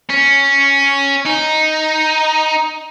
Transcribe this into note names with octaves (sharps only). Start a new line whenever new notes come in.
C#4
D#4